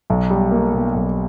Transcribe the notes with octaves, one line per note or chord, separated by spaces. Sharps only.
B1
G3
A#3
B2
B1